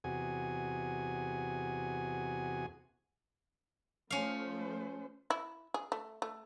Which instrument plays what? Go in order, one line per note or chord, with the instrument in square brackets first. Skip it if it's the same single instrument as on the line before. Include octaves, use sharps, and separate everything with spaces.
[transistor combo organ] E2 C3 F#4 G#4 G#5
[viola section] F3 A3 C5 [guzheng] C#4 F5
[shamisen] E4
G#4
A3
A3